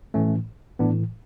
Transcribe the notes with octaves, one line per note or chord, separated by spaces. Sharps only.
A2 E3 A3 C#4
A2 E3 B3 D4